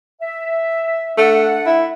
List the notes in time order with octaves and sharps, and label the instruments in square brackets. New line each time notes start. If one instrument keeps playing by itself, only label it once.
[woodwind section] E5
[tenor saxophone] A3 [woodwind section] D4 F#5
[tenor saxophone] E4